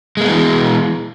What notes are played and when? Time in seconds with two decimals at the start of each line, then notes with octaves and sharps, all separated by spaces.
0.17 G#3
0.21 A#3
0.24 B3
0.28 E3